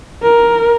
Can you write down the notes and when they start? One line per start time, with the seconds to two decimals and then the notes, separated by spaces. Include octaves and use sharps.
0.23 A#4